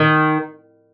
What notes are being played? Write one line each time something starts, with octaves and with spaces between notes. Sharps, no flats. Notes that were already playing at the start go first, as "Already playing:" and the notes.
Already playing: D#3